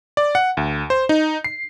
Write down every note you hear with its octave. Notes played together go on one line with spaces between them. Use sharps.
D5
F#5
D2
C5
D#4
C7